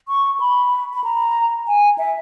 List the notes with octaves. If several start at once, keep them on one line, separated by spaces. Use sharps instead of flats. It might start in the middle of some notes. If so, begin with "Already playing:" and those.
C#6
B5
B5
A#5
G#5
E5